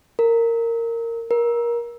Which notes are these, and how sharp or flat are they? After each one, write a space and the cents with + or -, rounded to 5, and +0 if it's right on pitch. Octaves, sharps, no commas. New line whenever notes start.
A#4 -15
A#4 +20